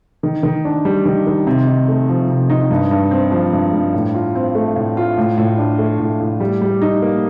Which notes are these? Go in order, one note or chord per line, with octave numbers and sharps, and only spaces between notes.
D#3
D#3
D4
G3
D#3
D#3
C3
D#4
A3
F3
C3
D#4
G2
G2
C4
F3
G2
G2
A2
F4
C4
A3
A2
F4
A2
A2
D4
A3
A2
A2
G3
G3
D#4
A#3